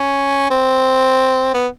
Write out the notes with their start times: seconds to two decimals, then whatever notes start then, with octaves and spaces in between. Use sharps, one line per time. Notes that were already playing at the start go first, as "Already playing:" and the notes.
Already playing: C#4
0.50 C4
1.54 B3